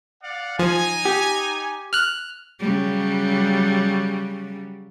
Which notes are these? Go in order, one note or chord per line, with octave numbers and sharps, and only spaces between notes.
D5 F5 F#5
F3 D#4 G#5
G4
F6 F#6
C#3 F#3 G3